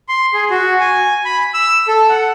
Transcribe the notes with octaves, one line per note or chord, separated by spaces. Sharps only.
C6
G#4
F#4
G#5
B5
E6
A4
F#5